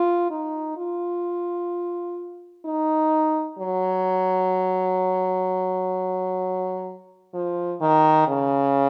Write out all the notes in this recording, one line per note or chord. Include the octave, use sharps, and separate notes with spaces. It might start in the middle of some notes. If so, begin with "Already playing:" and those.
Already playing: F4
D#4
F4
D#4
F#3
F3
D#3
C#3